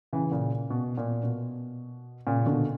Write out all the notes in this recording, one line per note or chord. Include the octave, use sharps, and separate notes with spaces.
C#3 E3
A#2 C#3
B2
A#2
B2
A#2 C#3
B2 D3